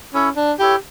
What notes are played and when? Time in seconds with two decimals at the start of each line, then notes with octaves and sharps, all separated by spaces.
0.14 C#4 E4 A4 C#5
0.36 D4
0.59 E4 G4 A4 C#5